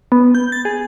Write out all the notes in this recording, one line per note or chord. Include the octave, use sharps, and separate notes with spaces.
B3
G6
A6
G#4